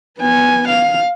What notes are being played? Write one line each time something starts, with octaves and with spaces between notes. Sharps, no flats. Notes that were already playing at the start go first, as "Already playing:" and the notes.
B3 G#5
F5